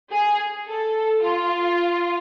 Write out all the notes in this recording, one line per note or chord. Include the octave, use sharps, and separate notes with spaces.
G#4
A4
F4